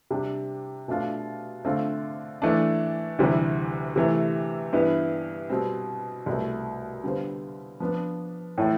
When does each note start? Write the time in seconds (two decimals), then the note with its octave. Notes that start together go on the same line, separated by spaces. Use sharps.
0.11 C3 G3 D4
0.88 B2 A3 D4 F4
1.65 D3 A3 C4 F4
2.42 E3 A3 D4
3.19 D2 C3 E3 G3
3.96 C3 E3 A3
4.73 G2 E3 B3 E4
5.50 B2 G3 C4
6.26 C2 B2 A3
7.03 D3 G3 B3 F4 C5
7.80 F3 B3 D4
8.58 A2 E3 A3